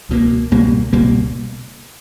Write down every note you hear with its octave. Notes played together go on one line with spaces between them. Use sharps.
C#2 B2 G3 A#3
C#2 B2 G3 A#3
C#2 B2 G3 A#3